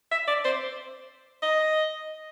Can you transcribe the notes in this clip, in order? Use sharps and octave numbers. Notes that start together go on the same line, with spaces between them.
E5
D5
C5
D#5